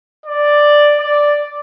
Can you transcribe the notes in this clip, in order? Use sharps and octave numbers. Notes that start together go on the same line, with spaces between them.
D5
D5